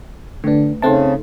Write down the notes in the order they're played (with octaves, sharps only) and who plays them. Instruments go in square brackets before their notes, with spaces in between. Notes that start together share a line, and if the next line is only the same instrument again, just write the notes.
[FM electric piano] D3 D4 [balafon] A3 B4
[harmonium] C#3 [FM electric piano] C4 A5 [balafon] D#4 A4 E5